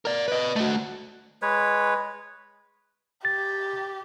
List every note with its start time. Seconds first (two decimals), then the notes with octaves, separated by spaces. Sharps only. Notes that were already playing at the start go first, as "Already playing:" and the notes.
0.05 A#4 D5
0.28 B4 D#5
0.56 A3 F#4
1.42 G#3 B4 C#5
3.25 G4 A6